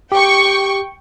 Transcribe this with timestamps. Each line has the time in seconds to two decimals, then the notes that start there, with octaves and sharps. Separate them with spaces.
0.12 G4 G5 C#6